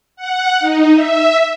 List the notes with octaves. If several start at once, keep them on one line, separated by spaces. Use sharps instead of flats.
F#5
D#4
E5